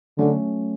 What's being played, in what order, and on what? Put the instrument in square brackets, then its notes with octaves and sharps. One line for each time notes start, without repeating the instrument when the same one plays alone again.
[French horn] D3 [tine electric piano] F#3 A3 C#4